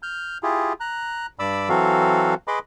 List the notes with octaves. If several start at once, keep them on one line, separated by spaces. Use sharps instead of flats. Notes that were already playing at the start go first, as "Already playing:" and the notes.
F6 G6
E4 F4 G4 G#4
A#5 F#6
G2 D5 B5 D6 E6
E3 F#3 C4 F#4 A4 F5
G#4 B4 D#5 B5 C6 D6